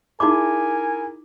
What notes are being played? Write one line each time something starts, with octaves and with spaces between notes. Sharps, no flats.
D#4 E4 G#4 A#4 G#5 D6